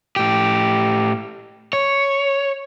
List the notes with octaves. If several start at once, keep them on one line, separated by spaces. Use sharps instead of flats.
A2 G4
C#5